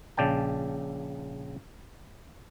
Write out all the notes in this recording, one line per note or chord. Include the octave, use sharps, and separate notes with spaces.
A#1 C#3 D5 G5 A5